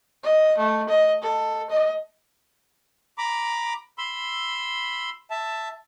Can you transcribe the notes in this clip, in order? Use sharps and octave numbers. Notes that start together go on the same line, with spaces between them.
D#5
A3
D#5
A4
D#5
A#5 B5 D6
B5 C6 E6
E5 A5